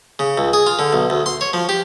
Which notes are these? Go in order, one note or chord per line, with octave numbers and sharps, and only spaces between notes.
C#3
C#2
G#4
F4
D3
B1
D2
C6
C#5
F3
G4